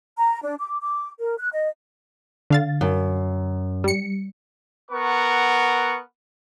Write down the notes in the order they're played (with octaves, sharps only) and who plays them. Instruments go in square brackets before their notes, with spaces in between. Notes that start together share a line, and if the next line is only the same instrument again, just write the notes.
[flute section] A#5
D4
D6
D6
A#4
F#6
D#5
[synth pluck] D3 F5 A6
[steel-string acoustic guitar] F#2
[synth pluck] G3 C#7
[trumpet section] B3 A#4 F#5 C#6